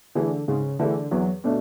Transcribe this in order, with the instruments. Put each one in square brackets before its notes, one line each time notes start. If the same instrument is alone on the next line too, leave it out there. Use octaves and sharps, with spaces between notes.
[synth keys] D3 [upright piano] E3 A3 E4 G#4
[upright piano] G#2 [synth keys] C#3
[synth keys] D3 [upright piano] E3 A3 E4 G#4
[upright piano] E2 [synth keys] F#3
[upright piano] B2 A3 D4